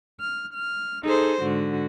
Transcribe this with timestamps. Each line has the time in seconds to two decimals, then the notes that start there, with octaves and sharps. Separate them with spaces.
0.20 F6
0.53 F6
1.03 D#4 G#4 A4 C5
1.41 G#2 D3 F#4